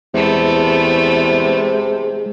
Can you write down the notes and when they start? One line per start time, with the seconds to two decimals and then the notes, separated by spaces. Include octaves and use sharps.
0.14 E2 C3 G#3 A3 B3